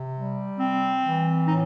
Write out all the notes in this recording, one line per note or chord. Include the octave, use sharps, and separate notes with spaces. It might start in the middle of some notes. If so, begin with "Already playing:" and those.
Already playing: C3
G3
C4
E3
A2 D#4